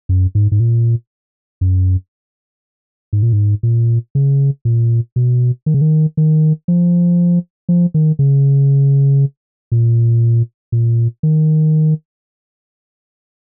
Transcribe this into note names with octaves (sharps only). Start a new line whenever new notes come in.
F#2
G#2
G#2
A#2
F#2
G#2
A#2
G#2
A#2
C#3
A#2
B2
D#3
C#3
D#3
D#3
F3
F3
D#3
C#3
A#2
A#2
D#3